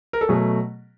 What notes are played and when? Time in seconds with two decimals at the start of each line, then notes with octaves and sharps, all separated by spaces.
0.13 A#4
0.21 A4
0.28 B2 F#3 A3 G#4